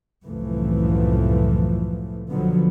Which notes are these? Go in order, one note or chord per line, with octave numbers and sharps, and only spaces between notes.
C2 F#2 A2 E3 F3 A3
B1 D3 F3 F#3 B3